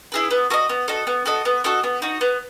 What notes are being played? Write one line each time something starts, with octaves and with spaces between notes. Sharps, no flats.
E4 G#4 B4
B3
F#4 A4 D#5
B3
F#4 A4 D#5
B3
F#4 A4 D#5
B3
F#4 A4 D#5
B3
D#4 F#4
B3